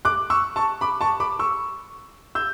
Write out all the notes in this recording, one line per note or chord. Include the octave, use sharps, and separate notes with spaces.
D6 F#6
C#6 E6
A5 C#6
B5 D6
A5 C#6
B5 D6
C#6 E6
E6 G6